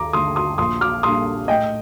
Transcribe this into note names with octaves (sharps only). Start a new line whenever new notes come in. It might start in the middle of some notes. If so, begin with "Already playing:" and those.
Already playing: D#2 A#5 D6
D3 A3 C6 D#6
C6 D#6
A#1 C6 D#6
D6 F6
A#2 G3 D4 C6 D#6
A2 D#5 G5